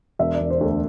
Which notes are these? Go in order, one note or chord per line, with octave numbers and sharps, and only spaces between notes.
E1 E5
D5
E1
C5
D2 A4